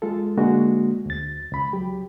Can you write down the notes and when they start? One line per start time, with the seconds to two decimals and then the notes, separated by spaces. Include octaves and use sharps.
0.02 G#3 F4 A4
0.37 D3 G#3 A#3 D4 F#4
1.06 D2 A6
1.52 C#2 B5
1.73 F#3 G4